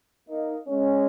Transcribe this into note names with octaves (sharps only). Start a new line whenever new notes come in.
A#3 D#4
G#3 C#4